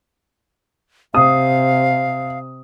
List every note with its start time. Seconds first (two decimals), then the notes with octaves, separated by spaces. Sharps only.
1.14 C3 F5 D#6